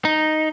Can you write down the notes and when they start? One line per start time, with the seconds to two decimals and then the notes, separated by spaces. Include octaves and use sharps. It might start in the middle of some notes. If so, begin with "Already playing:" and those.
0.05 D#4